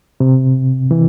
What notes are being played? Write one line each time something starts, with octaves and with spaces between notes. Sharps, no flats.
C3
E3